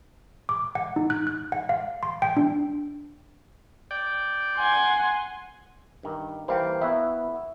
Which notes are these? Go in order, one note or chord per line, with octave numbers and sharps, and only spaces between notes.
D6
F#5
D#4
F#6
F#6
F#5
F5
C6
G5
D4
D5 G5
F#5 G#5 C6
G2 D#3
E3 G3 A#3 C5 F5 G5
B3 E4 F#4 E5